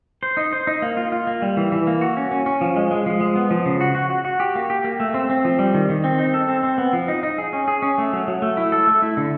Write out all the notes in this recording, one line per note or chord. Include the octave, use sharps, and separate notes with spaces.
C5
D#4
C5
D#4
A#3
F4
F4
A#3
G3
E3
E3
A#3
F#4
C#4
C#4
C#4
F3
G#3
G#3
F3
G#3
B3
F3
C#3
F#4
F#4
F#4
F#4
G4
A#3
G4
A#3
A3
C4
C4
F3
G3
D#3
D#3
C4
D#4
A4
C4
C4
B3
F3
D#4
D#4
G#4
C#4
G#4
C#4
A3
F#3
F#3
A3
E4
A4
A3
E4
D3